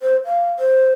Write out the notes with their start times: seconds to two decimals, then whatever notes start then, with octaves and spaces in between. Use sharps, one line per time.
0.02 C5
0.25 F5
0.59 C5